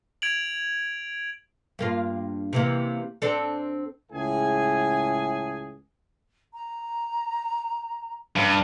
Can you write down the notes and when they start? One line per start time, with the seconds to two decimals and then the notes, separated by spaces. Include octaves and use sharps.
0.22 G#6 D7 F7 F#7
1.79 G2 A#3 F4
2.53 C3 E3 A#3
3.22 C4 D4 A4
4.11 C#2 A2 G#4 G#5
6.54 A#5
8.36 G2